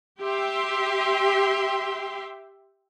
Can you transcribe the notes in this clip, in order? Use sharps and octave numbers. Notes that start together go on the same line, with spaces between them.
G4 E5 G5 C6